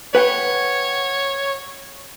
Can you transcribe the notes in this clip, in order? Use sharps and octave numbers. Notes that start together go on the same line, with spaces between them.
B4 C#5 F#5 G5